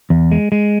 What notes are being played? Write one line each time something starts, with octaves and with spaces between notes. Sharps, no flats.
E2
G#3
G#3